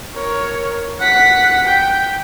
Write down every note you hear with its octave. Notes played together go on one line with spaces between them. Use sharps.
A#4 C#5
F#5 B6
G5